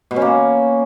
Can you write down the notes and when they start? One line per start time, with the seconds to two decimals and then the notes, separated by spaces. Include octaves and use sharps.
0.11 B2
0.16 C#4
0.22 A#3